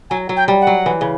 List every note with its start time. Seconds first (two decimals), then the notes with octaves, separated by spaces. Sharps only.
0.10 F#3 G#5
0.29 F#3
0.36 G5
0.48 G3
0.61 F#5
0.67 F#3
0.86 E3
1.01 C#3